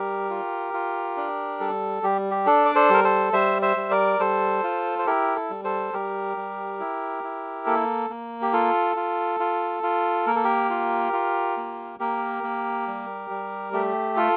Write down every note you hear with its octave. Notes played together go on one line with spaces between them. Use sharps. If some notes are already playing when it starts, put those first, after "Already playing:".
Already playing: G3 G4 A#4
F4
F4
D4
G3 A4
G3 G4
G4
D4 A4
D5
A4 C5
G3 A#4
A4 C5
G3 C5 E5
C5 E5
G3
A#4 D5
G3 A4 C5
F4
C5
E4 G4 A#4
A4
G3
A4 C5
G3 G4 A#4
G3
E4
E4
A#3 A4
A#3
G4
F4 A4
F4
F4
F4
A#3 A#4
A4
G4 A#4
F4
F4
A#3
A#3 G4 A#4
A#3
G3
G3
A3 G4
F4 A4